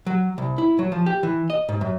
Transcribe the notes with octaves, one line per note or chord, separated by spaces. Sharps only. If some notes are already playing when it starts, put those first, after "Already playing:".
F#3
C2
E4
F#3
F3
G4
E3
D#5
G#2
F#2